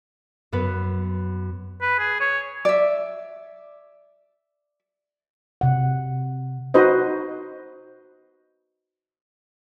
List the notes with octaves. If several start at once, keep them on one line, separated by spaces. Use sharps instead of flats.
F#2 B3 B4
B4
G#4
C#5
D5 E5
C3 F#5
D#4 F#4 B4 C5 D#5